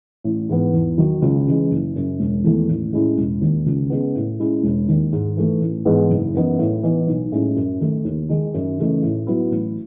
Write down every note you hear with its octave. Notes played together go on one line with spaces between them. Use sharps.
A1
G#2 E3 B3
E2
D#3 F#3
C#2
C#3 E3 G#3
F#1
F#2 C#3
E1
E2 D#3 A3
A1
A2 G#3 C#4 E4
E1
D#2 D#3
C#2
C#3 G#3 B3
A2
G#3 C#4 E4
E1
D#2 D#3
G#2
E3 A3
A1
G#2 E3 G#3 B3
F#1
F#2 E3 B3 D#4
A2
E3 B3 D#4
B1
A2 G#3 C#4
F#2
D#3 A3
D#2
D#3 G#3 D#4
F#2
C#3 E3 A3 D#4
A2
F#3 B3 E4
A1